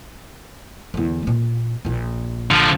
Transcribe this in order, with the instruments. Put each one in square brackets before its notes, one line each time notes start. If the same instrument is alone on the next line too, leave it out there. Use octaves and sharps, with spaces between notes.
[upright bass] E2 D3
A#2 A#3
A#1 A#2
[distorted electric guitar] D3 F3